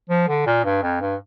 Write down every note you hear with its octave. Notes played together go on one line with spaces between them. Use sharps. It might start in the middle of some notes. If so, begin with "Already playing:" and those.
F3
D3
A#2
G2
F2
G2